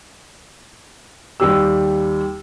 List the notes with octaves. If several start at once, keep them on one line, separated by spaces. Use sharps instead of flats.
D#2 G3 G4 E6